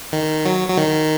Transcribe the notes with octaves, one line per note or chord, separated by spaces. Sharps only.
D#3
F#3
F#3
D#3